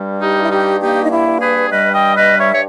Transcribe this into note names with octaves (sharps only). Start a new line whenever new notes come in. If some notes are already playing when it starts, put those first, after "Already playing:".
Already playing: G2 G3
D#4 G4
G2
E4
D#4 G4
A#3 D#4 G4
D#4
E4
G2
G#4 B4
G3 B4 D#5
D#5 G5
G2 B4 D#5
C#5 E5
C#5